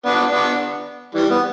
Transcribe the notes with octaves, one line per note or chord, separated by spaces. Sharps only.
B3 D4
B3 D4
E3 G3
B3